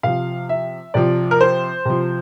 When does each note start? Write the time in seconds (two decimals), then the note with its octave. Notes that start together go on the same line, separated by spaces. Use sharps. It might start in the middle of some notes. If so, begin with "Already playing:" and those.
0.03 C3 F3 F5
0.49 E5
0.94 C3 F3 D5
1.31 A#4
1.41 C5
1.85 C3 F3